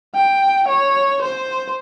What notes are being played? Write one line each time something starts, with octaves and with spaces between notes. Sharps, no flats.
G5
C#5
C5